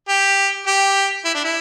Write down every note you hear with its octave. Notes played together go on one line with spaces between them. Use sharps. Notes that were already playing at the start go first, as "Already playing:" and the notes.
G4
G4
E4
D4
E4